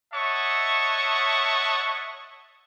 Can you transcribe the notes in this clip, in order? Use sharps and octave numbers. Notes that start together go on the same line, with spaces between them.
C#5 D#5 E5 F#5 A5 C#6